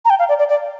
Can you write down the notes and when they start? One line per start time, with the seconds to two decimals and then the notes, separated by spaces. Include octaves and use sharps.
0.05 A#5
0.10 G5
0.19 F5
0.29 D5
0.39 D5
0.49 D5